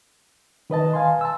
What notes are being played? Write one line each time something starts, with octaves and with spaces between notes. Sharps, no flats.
D#3 B4 D#5 A5
F5 G#5 C6
A5 E6